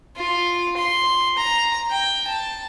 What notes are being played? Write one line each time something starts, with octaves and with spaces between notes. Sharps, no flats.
F4
C6
A#5
G5
A5